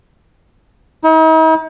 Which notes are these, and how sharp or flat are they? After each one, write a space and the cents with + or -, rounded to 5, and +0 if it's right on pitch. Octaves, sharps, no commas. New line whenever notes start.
D#4 +45